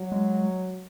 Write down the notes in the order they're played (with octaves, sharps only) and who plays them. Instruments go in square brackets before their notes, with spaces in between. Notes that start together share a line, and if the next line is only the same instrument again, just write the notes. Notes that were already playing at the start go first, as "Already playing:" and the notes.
Already playing: [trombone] F#3
[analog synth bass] G#3